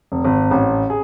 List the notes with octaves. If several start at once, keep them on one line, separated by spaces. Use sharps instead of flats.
F1
G#1
A1
G#4